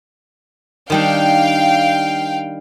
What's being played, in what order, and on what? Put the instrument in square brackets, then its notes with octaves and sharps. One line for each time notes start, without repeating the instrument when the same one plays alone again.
[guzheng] D#3 G3 D4 [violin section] F5 G5